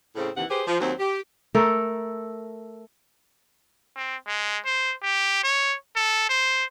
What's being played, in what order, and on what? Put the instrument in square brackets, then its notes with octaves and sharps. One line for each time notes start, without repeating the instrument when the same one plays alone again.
[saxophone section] A2 C#3 C4
D#2 C3 E3 F#5
G4 G#4 B4 C5
F3
D#2 F#3 C4 C5
G4
[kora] A3 A4 A#4
[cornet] C4
G#3
C5
G4
C#5
A4
C5